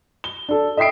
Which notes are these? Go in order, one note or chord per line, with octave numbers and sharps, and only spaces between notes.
G7
D4 A4
D#5 E5 G5 D#6 C7 D7